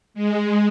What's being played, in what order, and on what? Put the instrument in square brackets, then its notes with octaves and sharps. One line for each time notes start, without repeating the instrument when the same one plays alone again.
[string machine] G#3